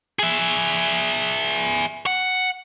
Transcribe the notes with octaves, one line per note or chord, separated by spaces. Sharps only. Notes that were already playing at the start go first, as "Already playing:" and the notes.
G#4 E5
F#5